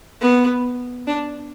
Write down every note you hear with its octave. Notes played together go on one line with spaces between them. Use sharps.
B3
D4